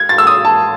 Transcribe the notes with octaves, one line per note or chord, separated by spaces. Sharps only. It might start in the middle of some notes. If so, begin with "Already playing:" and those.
Already playing: G#6
A6
E6
D#6
A5